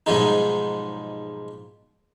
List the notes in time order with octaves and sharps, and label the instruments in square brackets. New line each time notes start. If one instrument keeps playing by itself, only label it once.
[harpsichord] B1 G#2 F3 G3 G#3 D#4